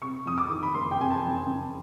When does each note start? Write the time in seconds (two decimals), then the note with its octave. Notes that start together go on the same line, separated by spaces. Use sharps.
0.01 C3 C#6
0.26 F2 D#6
0.38 D6
0.50 D#3
0.63 B5
0.74 F#1 C6
0.91 G5
0.98 C3 G#5
1.10 A5
1.23 F2
1.47 C#3